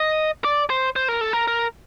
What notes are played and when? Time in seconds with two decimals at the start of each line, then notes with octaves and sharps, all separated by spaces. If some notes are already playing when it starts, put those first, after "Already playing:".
Already playing: D#5
0.44 D5
0.70 C5
0.96 C5
1.08 A#4
1.21 A4
1.33 A#4
1.48 A#4